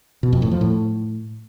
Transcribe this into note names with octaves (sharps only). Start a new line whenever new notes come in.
B2
F2
A2
F3
A2